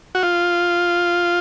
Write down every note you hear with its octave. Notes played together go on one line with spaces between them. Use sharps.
F#4
F4